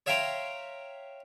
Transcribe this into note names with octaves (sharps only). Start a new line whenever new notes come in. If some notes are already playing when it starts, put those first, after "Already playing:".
C#5 E5 F5 G5 A#5 C6